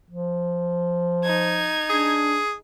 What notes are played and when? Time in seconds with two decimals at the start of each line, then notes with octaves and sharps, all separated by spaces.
0.10 F3
1.24 D#4 G#6
1.90 D4 G#4